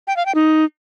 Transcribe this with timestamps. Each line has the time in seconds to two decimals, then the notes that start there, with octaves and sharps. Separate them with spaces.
0.07 G5
0.17 F5
0.26 G5
0.35 D#4